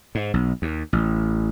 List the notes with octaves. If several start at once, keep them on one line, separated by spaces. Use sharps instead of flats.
G#2
B1
D#2
A1